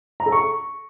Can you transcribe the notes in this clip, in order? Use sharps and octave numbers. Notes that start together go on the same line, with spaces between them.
A#5
A4
C#6